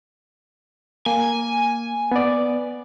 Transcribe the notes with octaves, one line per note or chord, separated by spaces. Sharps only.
A#3 G#5
B3 D5